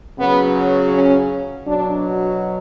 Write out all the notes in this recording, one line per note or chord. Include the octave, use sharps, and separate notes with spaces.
C#3 F#3 B3
C#4
B2 F#3 D4